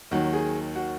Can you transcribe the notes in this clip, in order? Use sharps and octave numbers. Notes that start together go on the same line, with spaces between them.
D#2 D#3 F#3 F#4
G#4
F#4